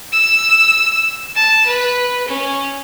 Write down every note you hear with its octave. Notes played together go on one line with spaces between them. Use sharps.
E6
A5
B4
C#4